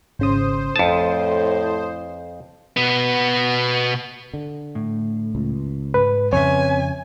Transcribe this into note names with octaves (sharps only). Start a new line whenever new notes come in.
G#1 C#3 C5 D#6
F2 A2 A5 D#6
B2 B3
D3
A2
C#2
G#2 B4
F2 C#3 C4 C#4 B4 C#5 E5 G#5